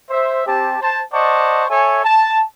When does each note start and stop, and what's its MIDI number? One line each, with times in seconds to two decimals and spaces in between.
0.10 0.43 72
0.10 0.43 76
0.46 0.77 60
0.46 0.77 67
0.46 0.77 81
0.81 1.02 72
0.81 1.02 81
1.14 1.65 72
1.14 1.65 74
1.14 1.65 75
1.14 1.65 78
1.14 1.65 81
1.14 1.65 85
1.69 2.04 69
1.69 2.04 73
1.69 2.04 76
1.69 2.04 80
2.05 2.43 81